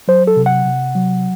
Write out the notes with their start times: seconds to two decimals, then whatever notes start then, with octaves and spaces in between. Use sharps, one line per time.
0.08 F#3 C5
0.27 A4
0.36 C3
0.46 F#5
0.65 C3
0.95 F#3